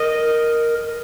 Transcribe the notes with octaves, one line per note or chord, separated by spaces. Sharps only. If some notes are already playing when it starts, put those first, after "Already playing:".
Already playing: A#4 D#5